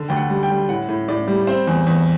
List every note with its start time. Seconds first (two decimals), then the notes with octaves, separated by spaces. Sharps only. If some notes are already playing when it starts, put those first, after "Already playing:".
Already playing: D3
0.09 D2 G5
0.16 F#5
0.29 G3
0.43 G5
0.49 G3
0.69 A2 F#5
0.88 A2
1.08 A2 D5
1.28 G3
1.47 C4 C5
1.67 E2
1.87 E2